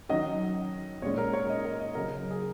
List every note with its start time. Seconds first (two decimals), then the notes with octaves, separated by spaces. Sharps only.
0.09 D#3 F#3 C#4 D#5
1.02 A#2 G#3 C#4 C#5
1.18 A#4
1.33 C#5
1.49 D#5
1.65 A#4
1.80 D#5
1.95 C#3 F#3 C#4 A#4
2.31 G#4